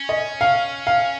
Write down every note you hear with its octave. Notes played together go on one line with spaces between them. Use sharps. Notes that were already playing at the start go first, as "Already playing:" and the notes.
Already playing: C#4
D#5
F5
F5